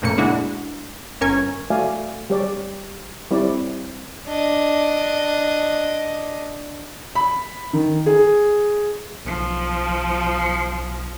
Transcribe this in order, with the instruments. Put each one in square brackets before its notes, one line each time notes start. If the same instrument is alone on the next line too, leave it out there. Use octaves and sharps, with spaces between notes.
[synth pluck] F2 A#2 C#3 A3 A#3 C#7
G#3 D4 E4 F#4
G1 C#4 A#4 G#5 C#6 G#6
[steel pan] A3 F#4 D5 E5 F5 G#5
G3 G4 C#5 D5
G3 C4 E4 C#5 D5
[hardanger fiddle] D4 D#5
[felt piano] B5
D#3
G#4
[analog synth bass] B1 [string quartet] F3